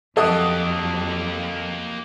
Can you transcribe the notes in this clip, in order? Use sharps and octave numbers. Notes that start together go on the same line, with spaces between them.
F2 F#3 A#3 G4 A4 D#5 F#5 D#6